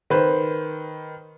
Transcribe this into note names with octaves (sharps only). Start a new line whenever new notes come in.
D#3 B4 C5